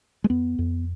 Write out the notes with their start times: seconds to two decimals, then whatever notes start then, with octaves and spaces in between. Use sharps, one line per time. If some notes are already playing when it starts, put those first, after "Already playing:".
0.24 G#3
0.30 F2 B3
0.59 F2